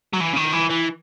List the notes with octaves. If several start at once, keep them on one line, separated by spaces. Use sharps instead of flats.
F#3
E3
C#3
D#3
E3
E3